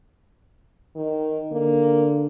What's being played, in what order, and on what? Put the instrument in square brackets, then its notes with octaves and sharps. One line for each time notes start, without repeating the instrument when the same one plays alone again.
[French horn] D#3
[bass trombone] D3 [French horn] A#3